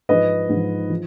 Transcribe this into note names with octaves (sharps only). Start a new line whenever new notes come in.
G#2 F3 B4 D#5
G#2 F3
F3